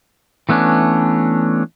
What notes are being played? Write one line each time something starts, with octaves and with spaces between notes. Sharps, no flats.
E3 A3 B3 C#4 D4